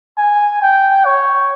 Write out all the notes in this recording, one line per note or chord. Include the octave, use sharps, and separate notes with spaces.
G#5
G5
C#5